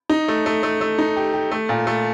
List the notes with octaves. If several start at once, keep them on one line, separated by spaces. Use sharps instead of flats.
D#4
A3
A3
A3
A3
D#4
G4
G4
A3
A#2
A3